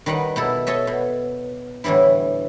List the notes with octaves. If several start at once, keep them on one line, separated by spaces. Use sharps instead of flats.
D#3 G3 B4 D#5 F#5
B2 E4 A4
A4 C#5 D#5 E5
B2
A2 D3 E3 G3 E4